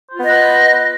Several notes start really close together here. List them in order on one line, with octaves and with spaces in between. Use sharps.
C5 F4 B3 D#5 B4